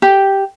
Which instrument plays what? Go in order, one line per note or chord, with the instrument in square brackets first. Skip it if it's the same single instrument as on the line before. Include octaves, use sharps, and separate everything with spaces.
[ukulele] G4